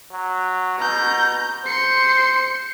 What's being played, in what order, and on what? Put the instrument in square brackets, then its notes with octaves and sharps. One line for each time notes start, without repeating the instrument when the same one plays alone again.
[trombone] F#3
[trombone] B2 [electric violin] A#5 G6
[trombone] C5 [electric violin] C6 C#7